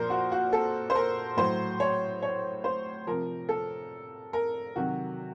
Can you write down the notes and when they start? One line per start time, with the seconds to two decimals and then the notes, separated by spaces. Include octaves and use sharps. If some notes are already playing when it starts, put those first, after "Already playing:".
Already playing: A#2 F3 A#4 C5
0.10 F#4
0.32 F#4
0.53 A4
0.90 C5
0.95 A#4
1.37 A2 F#3 C5
1.80 C#5
2.22 C#5
2.64 C5
3.07 C3 F3 A#4
3.49 A4
4.33 A#4
4.76 C3 D#3 F#3 F#4